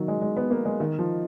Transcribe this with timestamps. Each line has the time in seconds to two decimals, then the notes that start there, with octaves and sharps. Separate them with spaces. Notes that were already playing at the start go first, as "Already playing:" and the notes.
Already playing: D#3 F#3
0.08 G#3
0.22 G#3
0.36 B3
0.51 A#3
0.65 G#3
0.80 D#3
0.99 F3